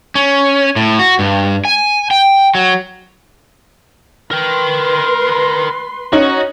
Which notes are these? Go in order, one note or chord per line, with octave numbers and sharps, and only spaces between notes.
C#4
A2
F#4
G2
G#5
G5
F#3
A#4 B4 G5 C6
C#4 D#4 F#4